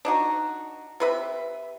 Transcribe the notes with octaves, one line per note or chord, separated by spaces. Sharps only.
D4 D#4 F#4
C3 B4 E5